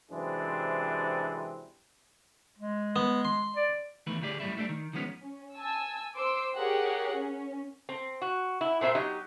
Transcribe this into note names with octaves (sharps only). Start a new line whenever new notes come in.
F#2 C3 E3 G#3 C4 D4
G#3
B3
C6
D5
E2 D#3 A3 B4
D2 A2 G4 G#4 D5
F#2 A2 G3 E4
G3 A3 D4
D#3
D#3 F3 G#3 B3 C#4
C#4
G#5 A5 E6
C5 C6 D6 E6
G4 G#4 A#4 C#5 F#5
C#4
C4
F#4
E4
A#2 C4 C5 E5
F#3 D#4 G4